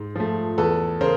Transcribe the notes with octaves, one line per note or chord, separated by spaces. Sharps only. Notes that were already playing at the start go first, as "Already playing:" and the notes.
Already playing: G#2
F3 A3
E2 A4 B4
C#3 A#4 C5